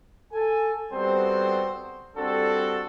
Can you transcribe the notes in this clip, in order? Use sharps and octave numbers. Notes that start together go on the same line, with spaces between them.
A4 G#5
G3 B3 C4 F#4 A4 C5
G3 C4 D4 F#4 A4